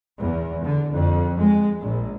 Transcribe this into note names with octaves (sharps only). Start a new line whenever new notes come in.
E2
D3
F2
G#3
A#1